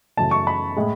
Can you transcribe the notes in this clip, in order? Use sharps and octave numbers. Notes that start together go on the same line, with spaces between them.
F#2 C#3 E3 A3 A5
C#6
B5
A2 G#3